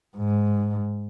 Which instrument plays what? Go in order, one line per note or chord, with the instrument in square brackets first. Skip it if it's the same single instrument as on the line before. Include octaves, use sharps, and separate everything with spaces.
[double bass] G#2